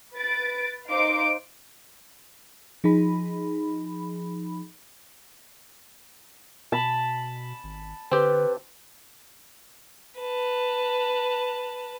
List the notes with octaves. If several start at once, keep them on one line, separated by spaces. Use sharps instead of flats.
B4 A6 D7
D#4 C5 F5 C6 D6 D7
F3 D#4 G#4 B5
B2 A5 B5
G#1
D3 C4 G4 B4
B4 A5